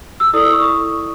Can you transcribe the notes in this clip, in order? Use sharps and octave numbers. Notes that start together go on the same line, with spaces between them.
E6
E4 A4 D5 D#6
C#6